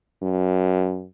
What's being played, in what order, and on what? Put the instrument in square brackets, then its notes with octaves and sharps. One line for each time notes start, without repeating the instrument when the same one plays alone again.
[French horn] F#2